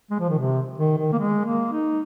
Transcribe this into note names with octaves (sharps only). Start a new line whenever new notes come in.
G#3
F3
D#3
C3
D#3
D#3
A#3
G#3
A#3
D#4